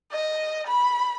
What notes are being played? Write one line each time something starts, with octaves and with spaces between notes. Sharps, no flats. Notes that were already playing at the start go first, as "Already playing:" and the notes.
D#5
B5